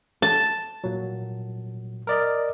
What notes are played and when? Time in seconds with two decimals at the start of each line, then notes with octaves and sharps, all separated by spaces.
0.22 A5
0.84 A#2 F#3
2.07 A#4 D5 D#5